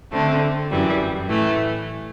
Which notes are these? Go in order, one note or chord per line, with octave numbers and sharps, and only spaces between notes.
D3 A3 C4
F#2 E3 G3
A2 E3 A3